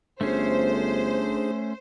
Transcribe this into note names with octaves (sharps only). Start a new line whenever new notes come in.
G1 A3 C#4 D4 G#4 C5